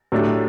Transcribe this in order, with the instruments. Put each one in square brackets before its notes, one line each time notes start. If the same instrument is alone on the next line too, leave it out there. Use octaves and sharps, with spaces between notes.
[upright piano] A2 F#3 A3 D4 G4